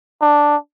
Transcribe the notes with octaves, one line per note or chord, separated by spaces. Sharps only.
D4